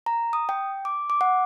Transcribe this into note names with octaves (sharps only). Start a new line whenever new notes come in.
A#5
D#6
G5
D6
D6
F#5